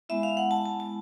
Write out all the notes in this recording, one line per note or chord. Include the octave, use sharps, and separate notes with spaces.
G#3 B3 E4 E5
F5
F#5
A5
A5
A5